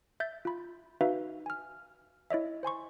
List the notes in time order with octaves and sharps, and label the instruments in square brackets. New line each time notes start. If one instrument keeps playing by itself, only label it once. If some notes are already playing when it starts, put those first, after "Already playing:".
[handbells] E5 G6 A6
F4 B5
D#4 F#4 B4 E5 F5
G#5 F6
E4 C#5 D#5 E5
C5 G#5 C6 C#6